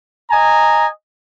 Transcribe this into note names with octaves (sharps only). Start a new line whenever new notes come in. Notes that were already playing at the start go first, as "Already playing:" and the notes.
D#5 G#5 A#5